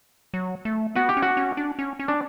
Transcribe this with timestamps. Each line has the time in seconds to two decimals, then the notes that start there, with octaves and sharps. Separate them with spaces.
0.34 F#3
0.65 A3
0.95 B3 F#4
1.09 G4
1.17 C#4
1.22 F#4
1.37 C#4
1.57 D4
1.79 C#4
1.99 C#4
2.08 D4